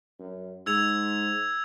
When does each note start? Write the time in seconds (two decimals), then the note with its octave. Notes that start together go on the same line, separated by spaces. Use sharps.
0.19 F#2
0.66 G#2 E6 G#6 F7